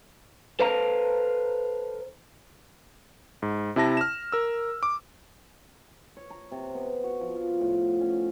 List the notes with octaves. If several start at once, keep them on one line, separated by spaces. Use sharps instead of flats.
A4 B4 C5 F5 A5 A#5
G#2
C3 E4 A5 A#6
F6 E7
A#4 E6
D6
C#5
A#5
C3
B3
F#4
F3
F4
A2
C#4